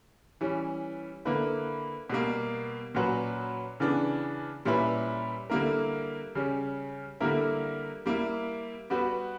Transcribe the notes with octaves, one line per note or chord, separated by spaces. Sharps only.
E3 G3 C#4
D3 A#3 E4 B4
B2 G3 A#3
A#2 F#3 C#4 F#4 B4
C#3 E3 B3 D4
A#2 G3 C#4 E4 B4
D3 G3 A#3 E4 A#4
C#3 G3 C#4
D3 G3 A#3 E4 A#4
G3 A#3 E4
G3 B3 F#4 B4